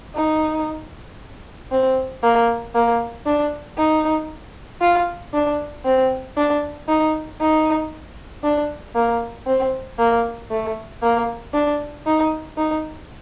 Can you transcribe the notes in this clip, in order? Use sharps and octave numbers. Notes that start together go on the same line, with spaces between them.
D#4
C4
A#3
A#3
D4
D#4
F4
D4
C4
D4
D#4
D#4
D4
A#3
C4
A#3
A3
A#3
D4
D#4
D#4